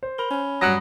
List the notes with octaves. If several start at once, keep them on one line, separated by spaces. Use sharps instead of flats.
C5
A#4 B5 G7
C#4
G2 F#3 A#5 D#6 F#6 A#6